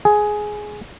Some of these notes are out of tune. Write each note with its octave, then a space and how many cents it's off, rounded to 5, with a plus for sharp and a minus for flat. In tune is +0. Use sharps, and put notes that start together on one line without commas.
G#4 +10